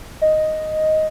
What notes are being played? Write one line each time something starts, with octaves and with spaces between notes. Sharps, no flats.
D#5